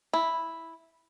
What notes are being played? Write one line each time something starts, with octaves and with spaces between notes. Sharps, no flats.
E4